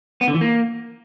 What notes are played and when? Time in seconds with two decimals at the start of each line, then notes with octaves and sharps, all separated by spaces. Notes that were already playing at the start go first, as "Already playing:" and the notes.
0.21 B3
0.28 D3
0.34 E3
0.41 A#3